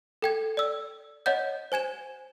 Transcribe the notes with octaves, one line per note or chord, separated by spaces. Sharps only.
A4 G5 G#6
D5 E6
C#5 D#5 F#5 G6
C5 G#5 G#6 E7